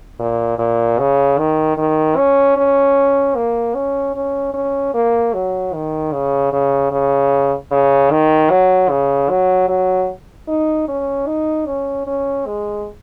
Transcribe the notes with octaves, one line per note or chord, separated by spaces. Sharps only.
A#2
A#2
C#3
D#3
D#3
C#4
C#4
A#3
C#4
C#4
C#4
A#3
F#3
D#3
C#3
C#3
C#3
C#3
D#3
F#3
C#3
F#3
F#3
D#4
C#4
D#4
C#4
C#4
G#3